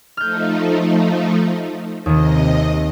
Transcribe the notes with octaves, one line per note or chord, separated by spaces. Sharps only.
F3 A3 D#4 F6 G6
D#2 C3 D#3 D#5